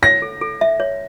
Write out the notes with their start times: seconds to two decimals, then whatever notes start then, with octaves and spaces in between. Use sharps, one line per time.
0.02 C#5 A#6
0.22 A4
0.41 A4
0.61 E5
0.80 C#5